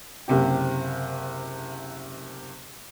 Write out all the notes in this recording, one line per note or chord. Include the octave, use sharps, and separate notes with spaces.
F#1 C3 G4